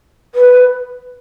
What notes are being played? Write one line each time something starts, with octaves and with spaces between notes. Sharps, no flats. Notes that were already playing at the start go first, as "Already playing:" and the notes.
B4